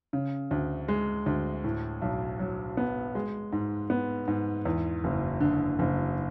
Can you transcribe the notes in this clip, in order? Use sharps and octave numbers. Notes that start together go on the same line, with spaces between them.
C#3
D2
G#3
D2
A2
B1
F#3
B3
G#3
G#2
B3
G#2
E2
F#1
D3
F#1